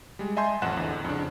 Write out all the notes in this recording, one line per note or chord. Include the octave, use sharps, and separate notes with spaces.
G3 G#3
D#5 E5 G#5 A5 C6 G6
A1 F2 F#5 F#6 E7
E2 D3
F2 C#3 D4